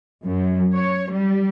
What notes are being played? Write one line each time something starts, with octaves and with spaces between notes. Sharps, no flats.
F#2
C#5
G3